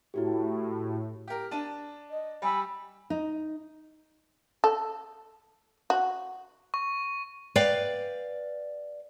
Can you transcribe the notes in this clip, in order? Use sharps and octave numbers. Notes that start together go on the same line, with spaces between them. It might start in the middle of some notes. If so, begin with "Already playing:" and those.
A2 E4 F#4 G4
G4 A#4
D4 A5 D#7
D#5
G3 G#5 B5 E6
D#4
A4
F#4
C#6
B4 D5 F5 G5